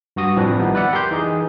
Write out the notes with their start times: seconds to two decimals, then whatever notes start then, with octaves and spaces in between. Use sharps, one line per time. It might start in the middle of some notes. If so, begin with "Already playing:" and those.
0.16 G2 F#4 D#6 A#6
0.36 A1 E3 F3 C4 D4 B4
0.59 D#3 F3 G3 B3 D#4
0.75 B4 D5 E5 F#5
0.93 G4 A#4 C6 G6
1.11 E3 D#4 G#4